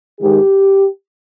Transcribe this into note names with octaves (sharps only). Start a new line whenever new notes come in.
G#2 D#3 G4